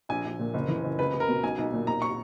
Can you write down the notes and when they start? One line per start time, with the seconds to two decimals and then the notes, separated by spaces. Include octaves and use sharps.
0.09 A#1 G#5
0.25 A#1
0.39 A#2
0.54 F#1
0.68 E3
0.84 F#1
0.99 C#2 B4
1.14 C#2
1.20 A#4
1.28 B2
1.43 B1 G#5
1.58 B1
1.73 A#2
1.87 B1 A#5
2.02 C#6